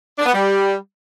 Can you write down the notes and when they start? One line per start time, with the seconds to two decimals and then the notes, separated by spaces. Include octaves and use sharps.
0.19 D4
0.26 B3
0.33 G3